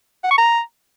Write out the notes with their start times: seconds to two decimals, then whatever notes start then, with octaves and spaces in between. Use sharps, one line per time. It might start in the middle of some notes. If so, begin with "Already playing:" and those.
0.24 F#5
0.31 C#6
0.38 A#5